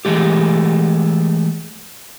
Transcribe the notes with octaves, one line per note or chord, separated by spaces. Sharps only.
E3 G#3 A3 G4